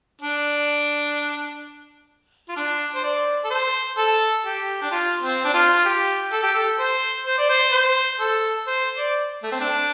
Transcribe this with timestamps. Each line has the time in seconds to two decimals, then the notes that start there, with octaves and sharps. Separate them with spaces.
0.21 D4
2.49 F4
2.56 D4
2.95 C5
3.04 D5
3.44 A4
3.50 C5
3.97 A4
4.45 G4
4.82 D4
4.91 F4
5.23 C4
5.45 D4
5.54 F4
5.74 F4
5.85 G4
6.32 A4
6.43 G4
6.54 A4
6.79 C5
7.26 C5
7.38 D5
7.49 C5
7.72 C5
8.20 A4
8.67 C5
8.98 D5
9.43 A3
9.52 C4
9.60 D4